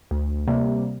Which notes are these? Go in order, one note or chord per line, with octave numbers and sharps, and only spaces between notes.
D2
C3 G3 A#3